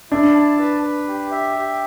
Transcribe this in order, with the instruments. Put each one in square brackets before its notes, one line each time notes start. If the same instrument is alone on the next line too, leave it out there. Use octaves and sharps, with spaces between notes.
[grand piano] D4 [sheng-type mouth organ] E4
[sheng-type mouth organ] A5
B4
B4
G4
E5
G4